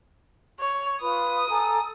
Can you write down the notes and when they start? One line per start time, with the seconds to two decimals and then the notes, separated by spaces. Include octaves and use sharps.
0.60 C#5
1.02 F4 B4 B5 D#6
1.50 A4 G#5 A#5